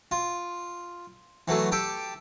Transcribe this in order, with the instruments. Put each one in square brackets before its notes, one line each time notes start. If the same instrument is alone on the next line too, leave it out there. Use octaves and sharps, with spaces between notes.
[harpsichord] F4
E3 F#3 A3
G4 A4 D6